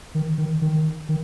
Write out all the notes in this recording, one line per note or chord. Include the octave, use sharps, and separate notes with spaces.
D#3
D#3
D#3
D#3